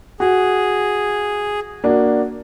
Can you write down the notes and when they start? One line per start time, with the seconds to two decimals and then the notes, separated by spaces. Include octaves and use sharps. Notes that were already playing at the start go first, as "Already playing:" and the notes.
0.20 F#4 G#4
1.84 A#3 D4 F#4